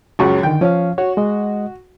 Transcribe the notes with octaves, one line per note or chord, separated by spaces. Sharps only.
C#2 F#2 C#3 F#4 C#6
D3 D#3 G5
F3 C#4 F5
F#4 C#5
G#3 D#5